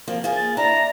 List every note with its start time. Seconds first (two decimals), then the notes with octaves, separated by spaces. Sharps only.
0.08 F3 A#3 C4
0.24 A#3 F4 G#4
0.36 A6
0.57 D4 E4 A#5